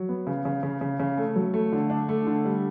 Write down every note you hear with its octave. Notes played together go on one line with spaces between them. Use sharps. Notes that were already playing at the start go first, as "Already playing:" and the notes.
Already playing: F#3
B3
C#3
C#3
C#3
C#3
C#3
A3
F#3
A3
D3
D4
A3
D3
G3